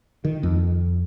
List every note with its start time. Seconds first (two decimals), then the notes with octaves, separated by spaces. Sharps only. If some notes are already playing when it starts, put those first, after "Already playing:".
0.25 D#3
0.43 F2